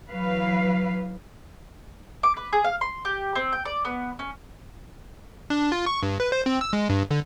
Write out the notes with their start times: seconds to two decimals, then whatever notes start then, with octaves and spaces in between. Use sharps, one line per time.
0.11 E3 F#3 B4 F5
2.23 D6
2.37 B4
2.53 G#4
2.64 F5
2.81 C6
3.05 G4
3.35 C4
3.53 G5
3.65 D5
3.85 B3
4.19 C#4
5.50 D4
5.72 F4
5.86 C#6
6.03 G2
6.20 B4
6.32 C5
6.46 C4
6.61 E6
6.73 G#3
6.90 G2
7.11 D3